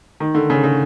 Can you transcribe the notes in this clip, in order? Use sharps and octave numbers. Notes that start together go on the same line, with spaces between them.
D#3
D3
C#3
C#3